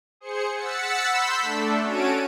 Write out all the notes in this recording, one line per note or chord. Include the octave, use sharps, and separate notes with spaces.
G#4 C5 C#7
F#5 E6 A6 B6 C#7
B5 C6 E6 G6 B6
A3 D4 A4
C#4 F#4 C#5 A5 D7 D#7